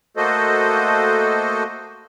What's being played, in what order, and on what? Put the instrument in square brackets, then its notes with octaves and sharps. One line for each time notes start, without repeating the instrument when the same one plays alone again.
[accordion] A3 A#3 F#4 A4 C5 D#5